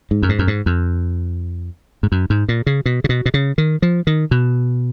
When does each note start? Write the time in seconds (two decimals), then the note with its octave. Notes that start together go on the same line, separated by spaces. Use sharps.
0.11 G#2
0.23 F#2
0.29 G#2
0.39 F#2
0.48 G#2
0.66 F2
2.03 G#2
2.12 F#2
2.30 G#2
2.49 A#2
2.67 C#3
2.86 B2
3.04 C#3
3.09 B2
3.26 B2
3.34 C#3
3.58 D#3
3.82 F3
4.07 D#3
4.31 B2